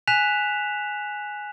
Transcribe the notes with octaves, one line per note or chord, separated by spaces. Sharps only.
G#5 F#6 B6 E7 F7